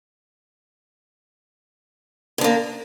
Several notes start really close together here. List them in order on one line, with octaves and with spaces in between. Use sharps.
D3 D4 A#3